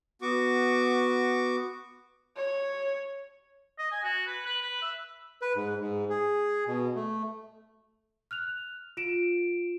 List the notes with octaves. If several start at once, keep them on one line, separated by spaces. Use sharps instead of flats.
B3 F#4 C#6 D6
C#5
D#5
G#5
F#4
B4
B4
B4
E5
B4
G#2
G#2
G#4
B2
A3
F6 F#6 F7
F4 D7 E7